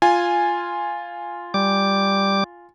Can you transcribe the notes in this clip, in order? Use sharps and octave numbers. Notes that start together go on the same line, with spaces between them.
F4 G#5
G3 D6